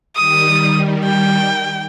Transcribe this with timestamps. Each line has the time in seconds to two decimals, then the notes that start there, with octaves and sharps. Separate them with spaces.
0.16 D#3 G3 D#6
1.04 G5